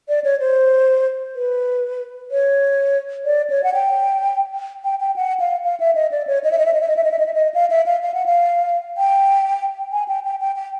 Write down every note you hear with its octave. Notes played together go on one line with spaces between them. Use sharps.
D5
C#5
C5
B4
C#5
D5
C#5
F#5
G5
G5
G5
F#5
F5
F5
E5
D#5
D5
C#5
D#5
E5
D#5
E5
D#5
E5
D#5
E5
D#5
E5
D#5
E5
D#5
F5
E5
F5
F5
F#5
F5
G5
G#5
G5
G5
G5
G5